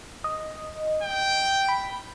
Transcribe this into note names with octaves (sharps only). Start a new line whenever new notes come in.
D#5
G5
B5